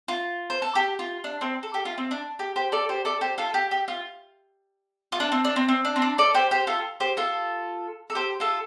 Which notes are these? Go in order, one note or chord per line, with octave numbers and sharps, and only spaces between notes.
F4
C5
A4
G4
F4
D4
C4
A4
G4
F4
C4
D4
G4
G4 C5
A4 D5
G4 C5
A4 D5
G4 C5
F4 A4
G4
G4
F4
F4
D4
C4
D4
C4
C4
D4
C4
D4
A4 D5
G4 C5
G4 C5
F4 A4
G4 C5
F4 A4
A4
G4 C5
F4 A4